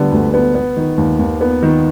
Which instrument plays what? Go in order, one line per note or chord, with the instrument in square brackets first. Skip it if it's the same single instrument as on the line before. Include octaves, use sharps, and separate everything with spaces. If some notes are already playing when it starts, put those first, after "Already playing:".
Already playing: [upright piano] D3 G3 B3
D2
B3
B3
D#3
D#2
D#2
B3
D#3